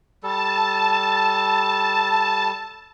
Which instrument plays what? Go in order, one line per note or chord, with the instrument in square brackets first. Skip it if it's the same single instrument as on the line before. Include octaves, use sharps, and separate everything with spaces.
[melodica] G3 A4 [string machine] A5